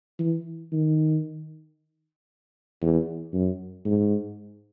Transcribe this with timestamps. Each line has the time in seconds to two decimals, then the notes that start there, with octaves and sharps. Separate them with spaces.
0.20 E3
0.72 D#3
2.82 E2
3.33 F#2
3.86 G#2